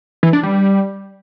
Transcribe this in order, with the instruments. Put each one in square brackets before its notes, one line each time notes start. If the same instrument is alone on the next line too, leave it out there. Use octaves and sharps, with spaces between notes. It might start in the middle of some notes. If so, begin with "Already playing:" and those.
[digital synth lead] E3
D4
G3